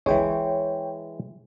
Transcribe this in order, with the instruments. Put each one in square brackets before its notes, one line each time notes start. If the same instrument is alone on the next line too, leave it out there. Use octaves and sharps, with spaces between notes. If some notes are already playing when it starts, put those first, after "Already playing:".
[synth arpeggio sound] G1 C#2 [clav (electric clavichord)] E3 G#3 [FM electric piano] C#5 G5